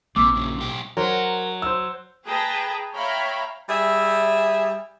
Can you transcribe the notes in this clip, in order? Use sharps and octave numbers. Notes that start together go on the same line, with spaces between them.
A#1 C3 D6 E6
F#2 C#3
B1 G4
F#3 A#4 C5
C5 E6
G#4 B4 G5 A5 A#5
C#5 E5 F5 G5 A#5 B5
G3 G#4 E5